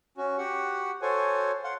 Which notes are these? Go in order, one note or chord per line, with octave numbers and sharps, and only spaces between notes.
C#4 F#4
F#4 G4 F#5
F#4 A4 C5 C#5 G#5
F5 F#5 C6